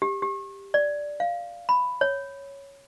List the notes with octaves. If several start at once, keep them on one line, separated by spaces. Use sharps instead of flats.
G4
G4
D5
F5
B5
C#5